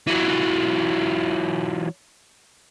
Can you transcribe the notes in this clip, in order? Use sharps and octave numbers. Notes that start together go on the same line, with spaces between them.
E3 F#3